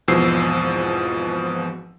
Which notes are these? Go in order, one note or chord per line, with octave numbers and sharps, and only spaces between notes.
G#1 E2 B2 F3 E6 C7